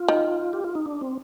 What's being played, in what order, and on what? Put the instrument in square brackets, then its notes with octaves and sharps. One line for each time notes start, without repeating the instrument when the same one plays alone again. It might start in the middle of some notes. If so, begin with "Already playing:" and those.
Already playing: [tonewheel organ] F4
[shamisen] D#3
[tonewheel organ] G4
F4
D#4
D4
C4